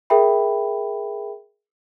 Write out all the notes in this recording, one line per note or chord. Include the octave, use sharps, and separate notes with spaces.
G#4 A#4 E5 G5 B5